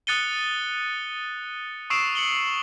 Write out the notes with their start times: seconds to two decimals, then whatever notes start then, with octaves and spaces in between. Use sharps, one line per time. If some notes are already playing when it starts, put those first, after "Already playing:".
0.07 D#6 F#6 A6 C#7 D#7 G7
1.90 C#6 D#6 E6 C7 D7 E7
2.15 C#7 F#7 G7